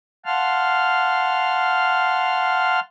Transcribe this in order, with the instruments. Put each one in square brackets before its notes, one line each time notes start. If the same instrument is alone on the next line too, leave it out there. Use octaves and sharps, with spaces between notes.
[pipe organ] F5 F#5 A5 C6 F6